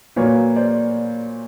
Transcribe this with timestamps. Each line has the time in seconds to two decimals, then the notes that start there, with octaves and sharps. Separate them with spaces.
0.16 A#2 F#3 A#3 B4 C#5
0.56 C5 D5